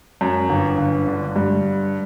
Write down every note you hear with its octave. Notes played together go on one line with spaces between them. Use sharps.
F#2
G1
G1
D3
G2